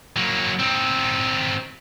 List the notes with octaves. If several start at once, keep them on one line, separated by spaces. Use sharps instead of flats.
F#3 A#3
C4 D#4